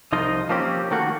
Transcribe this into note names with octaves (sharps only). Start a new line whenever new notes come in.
C2 F3 D#4 F4 D#5
F3 A#3 C4 C#4 G4
D#3 A3 A#3 F#4